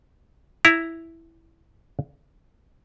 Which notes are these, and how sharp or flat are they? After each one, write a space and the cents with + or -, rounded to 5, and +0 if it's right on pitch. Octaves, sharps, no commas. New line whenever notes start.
E4 +0 A#5 +0